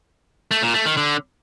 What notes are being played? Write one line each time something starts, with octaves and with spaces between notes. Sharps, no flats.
A3
A#2
A3
D#3
D3